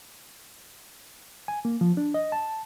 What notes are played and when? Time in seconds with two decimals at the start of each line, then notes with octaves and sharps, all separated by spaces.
1.48 G#5
1.65 A#3
1.81 F3
1.97 D4
2.14 D#5
2.32 A5